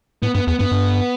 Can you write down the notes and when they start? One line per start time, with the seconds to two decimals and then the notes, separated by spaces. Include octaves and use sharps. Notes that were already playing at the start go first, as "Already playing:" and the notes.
0.22 A2 B3
0.34 G2 B3
0.47 E2 B3
0.59 G2 B3
0.72 G2